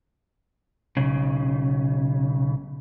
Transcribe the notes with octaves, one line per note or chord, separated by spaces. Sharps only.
B1 C#3